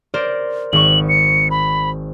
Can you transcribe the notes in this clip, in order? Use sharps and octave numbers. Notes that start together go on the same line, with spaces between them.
A#4 C5 D5
G#1 C#6 F#7
C#7
B5